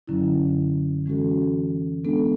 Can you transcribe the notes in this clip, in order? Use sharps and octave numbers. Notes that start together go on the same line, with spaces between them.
F#2 D3 F#3 C#4 E4
E3 G#3 C#4 F#4 A4
G#3 B3 D4 A4